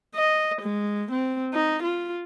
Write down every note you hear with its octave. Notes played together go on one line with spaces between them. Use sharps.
D#5
G#3
C4
D#4
F4